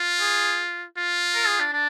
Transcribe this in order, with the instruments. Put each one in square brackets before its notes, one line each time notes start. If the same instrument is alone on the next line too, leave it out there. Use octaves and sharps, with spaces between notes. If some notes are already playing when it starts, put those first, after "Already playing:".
Already playing: [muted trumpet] F4
[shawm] G#4
[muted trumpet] F4
[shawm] A#4
G#4
D4
D4